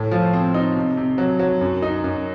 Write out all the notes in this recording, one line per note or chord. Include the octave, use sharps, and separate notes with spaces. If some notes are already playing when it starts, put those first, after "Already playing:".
Already playing: A2
F3
C4
D#4
C3
C3
F#3
F#3
F#2
D#4
F#2